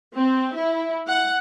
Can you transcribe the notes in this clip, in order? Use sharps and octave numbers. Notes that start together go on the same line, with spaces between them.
C4
E4
F#5